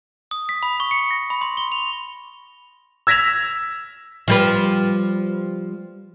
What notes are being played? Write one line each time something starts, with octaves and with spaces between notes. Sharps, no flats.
D#6
B6
B5
C#6
C#7
A#6
B5
C6
G7
F7
E6 G#6 A#6 B6 E7 F7
F3 G3 B4